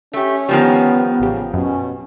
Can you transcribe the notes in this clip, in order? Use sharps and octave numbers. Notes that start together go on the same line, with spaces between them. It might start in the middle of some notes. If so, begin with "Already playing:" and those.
A3 C#4 G4 B6
D#3 F3 G3 B3
A1 C#3 G4
F#2 B2 C#4